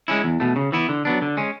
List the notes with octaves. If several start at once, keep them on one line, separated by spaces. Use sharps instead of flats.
G#3 C#4 E4
E2
B2 A3
C#3
E3 B3 E4
D3
F#3 B3 D4
D3
G#3 C#4